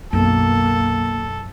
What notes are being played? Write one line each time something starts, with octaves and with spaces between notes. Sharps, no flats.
B1 F#2 B2 A#3 A4